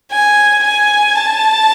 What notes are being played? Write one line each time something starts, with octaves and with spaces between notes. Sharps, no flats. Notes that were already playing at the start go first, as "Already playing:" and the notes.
G#5
G#5
A5